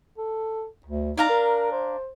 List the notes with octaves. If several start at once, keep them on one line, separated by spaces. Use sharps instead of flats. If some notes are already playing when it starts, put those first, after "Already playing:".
A4
D2
D4 D#4 F5 A#5
A#4
C5